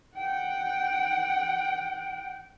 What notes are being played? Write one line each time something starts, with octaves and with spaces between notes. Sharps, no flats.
F#5 G5